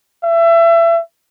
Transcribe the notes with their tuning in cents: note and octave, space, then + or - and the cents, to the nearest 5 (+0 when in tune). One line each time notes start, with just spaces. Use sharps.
E5 +30